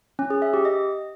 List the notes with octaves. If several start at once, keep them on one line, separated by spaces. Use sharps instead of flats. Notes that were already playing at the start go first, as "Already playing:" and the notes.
C#4
G#4
E5
G4
D#5